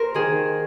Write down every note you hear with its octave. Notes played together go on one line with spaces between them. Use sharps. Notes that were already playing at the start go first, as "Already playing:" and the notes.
Already playing: A#4 C5
D#3 G#4